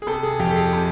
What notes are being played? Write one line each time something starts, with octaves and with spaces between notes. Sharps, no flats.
G#4
C3 A4
G#4
F2 G4
A4
G#4
C3